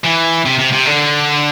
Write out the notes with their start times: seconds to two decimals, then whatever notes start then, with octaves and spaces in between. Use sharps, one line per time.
0.04 E3
0.45 C3
0.59 C3
0.73 C3
0.86 D3